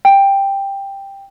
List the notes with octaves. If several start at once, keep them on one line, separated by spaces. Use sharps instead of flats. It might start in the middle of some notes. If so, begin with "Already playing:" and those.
G5